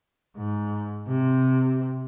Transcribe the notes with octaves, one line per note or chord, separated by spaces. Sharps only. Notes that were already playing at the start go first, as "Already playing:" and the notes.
G#2
C3